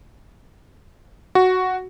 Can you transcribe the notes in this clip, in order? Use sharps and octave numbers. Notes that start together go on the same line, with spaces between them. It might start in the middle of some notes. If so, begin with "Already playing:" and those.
F#4